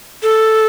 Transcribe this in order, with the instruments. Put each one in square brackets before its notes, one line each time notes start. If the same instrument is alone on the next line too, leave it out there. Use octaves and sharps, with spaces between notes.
[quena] A4